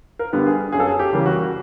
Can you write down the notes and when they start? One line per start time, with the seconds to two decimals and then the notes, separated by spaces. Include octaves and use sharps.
0.19 A#4
0.33 G2 D3 G3 B3
0.46 G#4
0.72 F#2 G#4
0.80 A4
0.87 G#4
0.99 G4
1.12 C#3 E3 G3 A#3
1.26 F#4